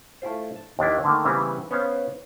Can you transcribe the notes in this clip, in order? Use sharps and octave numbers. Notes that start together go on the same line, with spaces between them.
A3 E4 F4 C5
A5
D#2 D#3 D4 E4
D3 D#3 A3 A#3
C#3 E3 G3 B3 C4 E4
B3 C#4 C5 C#5 F5